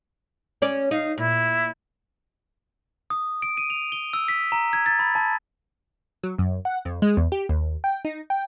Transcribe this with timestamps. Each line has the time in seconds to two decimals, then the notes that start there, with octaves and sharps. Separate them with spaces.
0.62 C#4 D5
0.91 D#4 F5
1.18 A#2 E4
3.10 D#6
3.42 D7
3.57 D#7
3.70 F7
3.92 G7
4.13 E6
4.28 B6
4.52 A#5
4.73 G#6
4.86 A6
4.99 B5
5.15 A5
6.23 F#3
6.39 F#2
6.65 F#5
6.85 F2
7.02 G#3
7.17 E2
7.32 G4
7.49 D#2
7.84 G5
8.05 D#4
8.30 G5